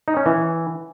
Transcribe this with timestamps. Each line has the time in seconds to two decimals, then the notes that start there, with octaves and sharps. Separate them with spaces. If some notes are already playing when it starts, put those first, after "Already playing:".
0.08 D#4
0.17 C#4
0.26 E3